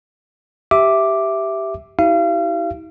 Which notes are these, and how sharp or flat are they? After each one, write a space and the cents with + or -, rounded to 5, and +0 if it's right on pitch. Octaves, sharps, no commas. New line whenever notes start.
G4 -5 E5 +0 D6 +0
E4 -45 G4 -40 F5 -35